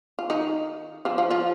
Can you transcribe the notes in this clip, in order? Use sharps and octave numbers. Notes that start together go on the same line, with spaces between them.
F4
D#3 D#4
F3 F4
F3 F4
F3 F4